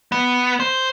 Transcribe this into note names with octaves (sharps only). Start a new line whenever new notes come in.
B3
C5